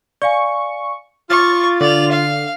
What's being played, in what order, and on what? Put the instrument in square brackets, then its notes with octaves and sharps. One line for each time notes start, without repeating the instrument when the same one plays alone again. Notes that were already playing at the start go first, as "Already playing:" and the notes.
[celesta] D5 F5 G#5 [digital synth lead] C#6
[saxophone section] F4 [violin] C#6 [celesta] D6 F6 [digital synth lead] A6
[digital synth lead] D3 [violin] D5 F7
[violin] F5